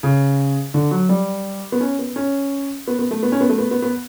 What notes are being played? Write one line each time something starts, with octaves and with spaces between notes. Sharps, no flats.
C#3
D3
F#3
G3
B3
C#4
B3
C#4
B3
B3
A3
B3
C#4
B3
A3
B3
B3
B3